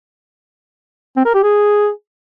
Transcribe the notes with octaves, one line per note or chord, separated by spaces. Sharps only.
C4
A#4
G4
G#4